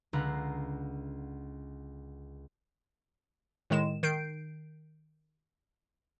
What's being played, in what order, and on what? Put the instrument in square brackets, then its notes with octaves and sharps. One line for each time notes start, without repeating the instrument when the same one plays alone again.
[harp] C#2 D3 F5 F#5 A#5 B5
[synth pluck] A2 D#3 G#3 E7
D#3 G6 C7 D7